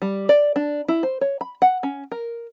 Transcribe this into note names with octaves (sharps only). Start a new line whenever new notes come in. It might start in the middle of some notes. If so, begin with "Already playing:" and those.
G3
D5
D4
E4
C5
C#5
B5
F#5
C#4
A#4